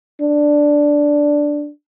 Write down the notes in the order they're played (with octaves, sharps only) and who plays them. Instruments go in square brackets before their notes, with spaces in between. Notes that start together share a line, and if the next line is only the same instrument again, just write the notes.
[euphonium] D4